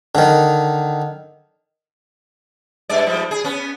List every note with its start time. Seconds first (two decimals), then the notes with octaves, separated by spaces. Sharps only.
0.15 D3 D#3
2.89 G2 G#3 D5
3.06 G#2 F3 G3
3.31 G#4
3.44 B3 C#4